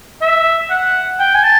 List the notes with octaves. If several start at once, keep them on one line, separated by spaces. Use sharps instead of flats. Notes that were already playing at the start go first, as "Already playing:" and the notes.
E5
F#5
G5
G#5
A5